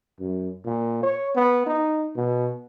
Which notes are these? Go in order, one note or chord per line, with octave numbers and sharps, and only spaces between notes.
F#2
A#2
C#5
B3
D#4
B2